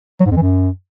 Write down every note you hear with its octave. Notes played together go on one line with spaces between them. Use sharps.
F#3
G#2
F2
E3
F#2